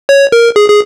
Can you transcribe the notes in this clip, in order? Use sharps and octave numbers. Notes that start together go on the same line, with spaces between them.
C#5
A#4
G#4
G#4